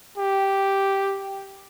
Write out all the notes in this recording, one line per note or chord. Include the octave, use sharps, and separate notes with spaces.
G4